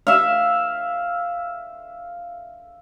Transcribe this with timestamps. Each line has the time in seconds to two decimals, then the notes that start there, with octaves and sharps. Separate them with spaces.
0.07 E5 F5